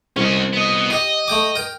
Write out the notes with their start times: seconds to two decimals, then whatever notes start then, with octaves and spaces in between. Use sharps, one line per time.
0.17 C2 C#4 D#5
0.53 B3 D#5
0.90 D#4 G4 D#5
1.28 A3 G5 D6
1.56 A#4 G5